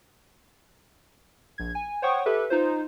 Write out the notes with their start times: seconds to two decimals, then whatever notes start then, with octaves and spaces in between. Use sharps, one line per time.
1.58 A#1 G#6
1.75 G#5
2.02 C5 C#5 F#5 G5 C#6 D#6
2.26 G4 A4 B4 E5
2.50 D#4 F4 C5